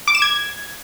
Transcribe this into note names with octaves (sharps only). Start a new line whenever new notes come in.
D6
E7
G#6